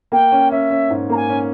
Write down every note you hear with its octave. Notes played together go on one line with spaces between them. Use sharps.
A#3 G5
C#4
C#4 E5
C#4
G#2
A#3 A#5
G#5
C#4